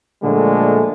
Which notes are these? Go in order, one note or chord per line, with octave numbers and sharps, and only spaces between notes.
A#2 D3 F3 G#3 A3